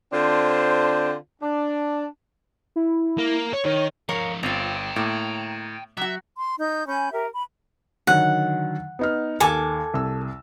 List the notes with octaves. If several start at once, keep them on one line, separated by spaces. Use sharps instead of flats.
D3 C4 D4 F4 C5
D4
E4
A#3
C#5
D#3 C#5
F3 D#4 A#4 C#5 F5
G1 C4 F4 G5 A#5
A2 A#3
F#3 F#4 E5
C6
D#4 G6
C#4 G#5 B5 G6
G4 A#4 E5
B5
D3 D#3 F#3 F#5
B3 D#4 F6
D#2 A4 G#5 D6
C2 E6